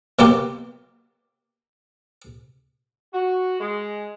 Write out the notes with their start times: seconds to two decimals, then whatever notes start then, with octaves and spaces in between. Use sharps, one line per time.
0.19 B2 F#3 A#3 F4 G4
3.14 F#4
3.60 G#3